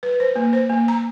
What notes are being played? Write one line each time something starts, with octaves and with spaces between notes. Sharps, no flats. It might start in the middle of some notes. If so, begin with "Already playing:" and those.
B4
C5
A#3
C5
A#3
A#5